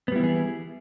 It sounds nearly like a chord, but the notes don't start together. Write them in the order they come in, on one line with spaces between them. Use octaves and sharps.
B3 G3 E4 E3 G#4